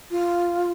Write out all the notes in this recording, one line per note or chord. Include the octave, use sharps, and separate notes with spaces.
F4